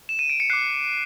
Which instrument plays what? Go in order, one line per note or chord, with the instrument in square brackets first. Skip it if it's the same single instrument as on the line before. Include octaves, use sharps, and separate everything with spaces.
[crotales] E7
D#7
D7
C#7
D6 F#6 C7